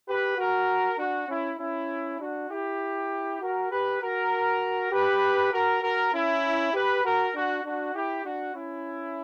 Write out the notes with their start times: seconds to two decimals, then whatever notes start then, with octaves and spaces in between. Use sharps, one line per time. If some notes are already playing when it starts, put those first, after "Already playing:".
0.09 G4 B4
0.38 F#4 A#4
0.99 D4 F#4
1.29 C#4 E4
1.60 C#4 E4
2.20 D4 F#4
2.50 E4 G4
3.41 F#4 A#4
3.71 G4 B4
4.01 F#4 A#4
4.92 G4 B4
5.53 F#4 A#4
5.83 F#4 A#4
6.13 C#4 E4
6.74 G4 B4
7.05 F#4 A#4
7.35 D4 F#4
7.64 D4 F#4
7.95 E4 G4
8.26 D4 F#4
8.55 C#4 E4